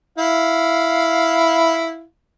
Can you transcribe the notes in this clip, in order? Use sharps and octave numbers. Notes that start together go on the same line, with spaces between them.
E4 F5